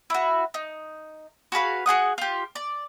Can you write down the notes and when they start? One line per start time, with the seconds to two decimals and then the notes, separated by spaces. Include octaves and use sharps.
0.10 E4 F#4
0.54 D#4
1.52 F#4 G#4 B4 F5
1.86 F#4 G#4 F#5 D#6
2.18 F4 G4
2.55 D5